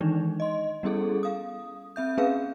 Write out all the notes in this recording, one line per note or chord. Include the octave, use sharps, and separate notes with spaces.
D#3 E3 G#3 D4 D#4
D#5 C6
G3 B3 C#4 E4 G#4 A4
F5 D#6
C4 E5 G6
A#3 C#4 G#4 B4 F5